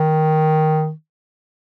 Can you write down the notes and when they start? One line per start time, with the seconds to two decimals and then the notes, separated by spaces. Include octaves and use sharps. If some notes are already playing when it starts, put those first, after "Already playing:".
Already playing: D#3